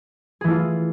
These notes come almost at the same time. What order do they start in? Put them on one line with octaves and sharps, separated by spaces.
G#4 E3 A3 F4